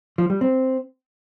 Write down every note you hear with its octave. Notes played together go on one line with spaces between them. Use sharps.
F3
G3
C4